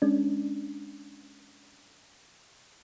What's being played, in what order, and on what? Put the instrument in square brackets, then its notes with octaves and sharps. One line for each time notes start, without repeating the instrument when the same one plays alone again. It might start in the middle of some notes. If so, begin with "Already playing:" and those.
[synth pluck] G#3 C#4 D4